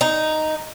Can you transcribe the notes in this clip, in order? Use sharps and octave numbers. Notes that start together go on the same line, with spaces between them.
D#4